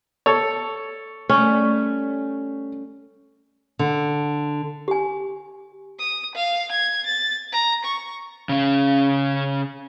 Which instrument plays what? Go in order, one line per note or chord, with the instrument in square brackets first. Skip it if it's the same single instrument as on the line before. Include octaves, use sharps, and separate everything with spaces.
[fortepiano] A4 C#5
[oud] G3 A3 [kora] C#4
[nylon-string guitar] D3
[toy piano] G4 G#5
[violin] D#6
F5
G#6
A6
A#5
C#6
[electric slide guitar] C#3 C#4